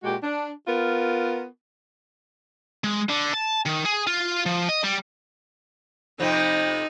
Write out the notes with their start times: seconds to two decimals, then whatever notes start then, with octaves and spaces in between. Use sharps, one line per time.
0.04 A#2 G#3 F#4 G4
0.23 D4
0.67 B3 F4 A#4
2.84 G#3
3.10 D3
3.34 A5
3.66 D#3
3.86 G#4
4.07 F4
4.46 F3
4.69 D#5
4.84 G3
6.20 F2 C3 F3 D#4